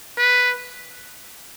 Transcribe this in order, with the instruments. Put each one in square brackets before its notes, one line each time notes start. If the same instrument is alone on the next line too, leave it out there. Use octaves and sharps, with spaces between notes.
[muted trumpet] B4